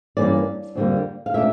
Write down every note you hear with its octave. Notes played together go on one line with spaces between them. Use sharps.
G2 E3 G3 A#3 C#4 D5
F2 D3 G3 A#3
F5
A#2 A3 D4 E5